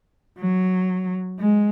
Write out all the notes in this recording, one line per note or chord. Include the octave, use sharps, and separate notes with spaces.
F#3
G#3